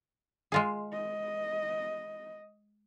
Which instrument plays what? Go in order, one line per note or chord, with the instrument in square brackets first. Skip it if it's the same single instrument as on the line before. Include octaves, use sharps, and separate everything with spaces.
[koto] G#3 F4 G#4
[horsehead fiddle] D#5